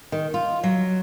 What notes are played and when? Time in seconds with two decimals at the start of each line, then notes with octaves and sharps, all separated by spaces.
0.12 D#3
0.34 F4
0.64 F#3